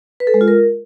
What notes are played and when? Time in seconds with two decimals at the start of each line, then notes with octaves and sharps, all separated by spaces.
0.20 B4
0.27 A4
0.34 G#3
0.41 F4
0.48 A#4